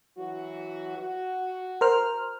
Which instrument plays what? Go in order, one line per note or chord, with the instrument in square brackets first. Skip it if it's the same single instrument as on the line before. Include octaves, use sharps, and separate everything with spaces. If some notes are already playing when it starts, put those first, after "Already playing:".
[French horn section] E3 F#3 F#4
F#4
[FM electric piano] A#4 C5 F6